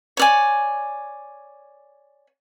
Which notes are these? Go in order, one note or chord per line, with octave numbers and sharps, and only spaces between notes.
C#5 D5 G#5